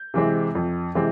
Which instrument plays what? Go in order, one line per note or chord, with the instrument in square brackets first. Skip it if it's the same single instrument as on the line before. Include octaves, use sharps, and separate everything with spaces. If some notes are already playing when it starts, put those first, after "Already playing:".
Already playing: [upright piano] G6
C3 E3 G#3 C4
F2
C3 E3 G#3 C4